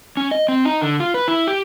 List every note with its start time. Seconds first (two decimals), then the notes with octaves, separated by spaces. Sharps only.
0.17 C#4
0.31 D#5
0.48 C4
0.65 D#4
0.81 D3
1.00 F4
1.14 B4
1.28 E4
1.47 G4